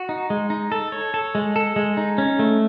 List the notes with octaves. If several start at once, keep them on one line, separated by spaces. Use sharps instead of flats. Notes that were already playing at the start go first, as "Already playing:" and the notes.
Already playing: F#4
D#4
G#3
D#4
A4
C#5
A4
G#3
A4
G#3
D#4
C#4
A3